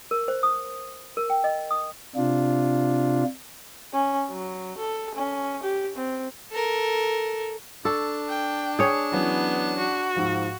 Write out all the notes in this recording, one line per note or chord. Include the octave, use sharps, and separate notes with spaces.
A#4
C5
D#6
A#4
G5
D#5
D#6
C3 D4 F4
C#4
F#3
A4
C#4
G4
C4
A4 A#4
D4 A4 C#6
G5
G#4 C#5
E3 F#3 B3 C#4
F#4
G#2 F3 F5